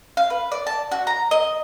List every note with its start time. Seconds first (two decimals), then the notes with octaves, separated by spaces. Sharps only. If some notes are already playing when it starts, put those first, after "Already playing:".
0.17 F5
0.30 B4
0.52 D5
0.67 A5
0.91 F#4
1.07 A#5
1.31 D#5